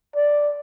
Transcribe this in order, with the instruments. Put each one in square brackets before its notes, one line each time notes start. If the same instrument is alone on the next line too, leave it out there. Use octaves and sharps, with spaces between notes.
[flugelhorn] D5